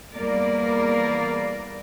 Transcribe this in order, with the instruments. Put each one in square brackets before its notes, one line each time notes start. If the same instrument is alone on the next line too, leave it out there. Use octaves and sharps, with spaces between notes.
[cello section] E2 G3 A#3 A#4 D5